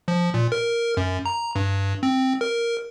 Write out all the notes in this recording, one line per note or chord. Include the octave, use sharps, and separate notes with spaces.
F3
A#2
A#4
F#2
A#5
G2
C4
A#4